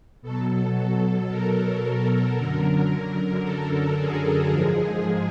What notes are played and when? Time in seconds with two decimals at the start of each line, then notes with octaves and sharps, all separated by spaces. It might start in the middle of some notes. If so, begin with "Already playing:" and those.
0.22 B2 F#3 A4
1.30 A#4
2.36 F#2 D3 F#3
3.43 A4
3.97 G#4
4.50 G#2 F3 G#3